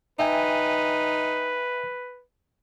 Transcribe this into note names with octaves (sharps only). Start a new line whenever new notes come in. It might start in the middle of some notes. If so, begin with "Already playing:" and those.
D#4 B4 E5 G5 G#5